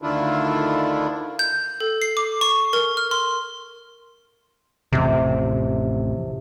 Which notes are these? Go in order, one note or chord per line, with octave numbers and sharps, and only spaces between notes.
D2 D3 D#3 D4 E4 F4
G6
A4
C7
D6
C#6
A#4
F6
C6
A1 F2 C3